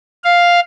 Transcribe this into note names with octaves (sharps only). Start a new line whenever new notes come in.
F5